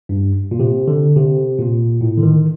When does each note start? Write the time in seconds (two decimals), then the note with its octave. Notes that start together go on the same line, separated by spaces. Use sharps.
0.09 G2
0.51 A#2
0.60 C3
0.88 D3
1.16 C3
1.59 A#2
2.01 A2
2.18 D3
2.23 D#3